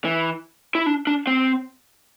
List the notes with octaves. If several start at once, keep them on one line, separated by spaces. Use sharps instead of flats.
E3
E4
D4
D4
C4